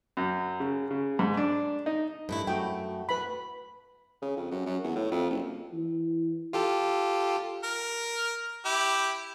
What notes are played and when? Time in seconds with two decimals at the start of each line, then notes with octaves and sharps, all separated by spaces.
0.17 F#2
0.60 C#3
0.91 C#3
1.19 G#2
1.37 D4
1.86 D#4
2.29 G2 A3 E4
2.47 F#2 A3 F#4 G5
3.09 F#4 B4 B5
4.22 C#3
4.37 F2
4.51 F#2
4.66 F#2
4.84 E2
4.96 A2
5.12 F2
5.30 F#1
5.73 E3
6.53 F4 G4 A4
7.64 A#4
8.65 E4 G4